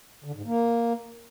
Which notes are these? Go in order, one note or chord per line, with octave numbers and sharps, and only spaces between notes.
D3
G#2
A#3